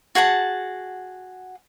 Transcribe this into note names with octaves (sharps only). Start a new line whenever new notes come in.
F#4 G#4 F#5 A5